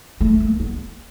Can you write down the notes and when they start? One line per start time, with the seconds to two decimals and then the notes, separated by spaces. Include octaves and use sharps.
0.21 A3
0.40 A#3
0.60 B3